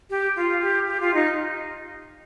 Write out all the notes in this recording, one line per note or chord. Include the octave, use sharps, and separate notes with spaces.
G4
F4
G4
G4
F4
D#4